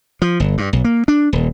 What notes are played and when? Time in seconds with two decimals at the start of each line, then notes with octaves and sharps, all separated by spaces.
0.22 F3
0.40 G1
0.58 G2
0.73 B1
0.84 A#3
1.08 D4
1.33 D#1